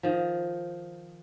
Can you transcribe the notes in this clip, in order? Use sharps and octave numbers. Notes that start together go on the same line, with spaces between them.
D#3 F3